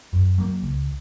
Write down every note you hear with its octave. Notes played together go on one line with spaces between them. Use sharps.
F#2
F#3 A#3
C#2